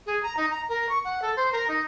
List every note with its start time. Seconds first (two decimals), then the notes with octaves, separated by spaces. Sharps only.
0.06 G#4
0.23 A#5
0.37 D#4
0.51 A#5
0.69 A#4
0.89 C#6
1.04 F#5
1.22 A4
1.37 C5
1.52 A#4
1.68 D#4